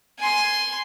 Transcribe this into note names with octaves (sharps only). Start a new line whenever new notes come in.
G#5 C6